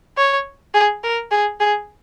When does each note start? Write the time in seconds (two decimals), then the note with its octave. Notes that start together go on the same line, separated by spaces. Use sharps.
0.18 C#5
0.74 G#4
1.04 A#4
1.31 G#4
1.60 G#4